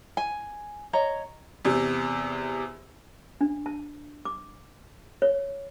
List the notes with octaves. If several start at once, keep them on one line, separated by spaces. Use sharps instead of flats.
G#5
C#5 D#5 A#5
E2 C3
D4
A5
D6
C#5